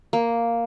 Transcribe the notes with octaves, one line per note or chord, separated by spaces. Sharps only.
A#3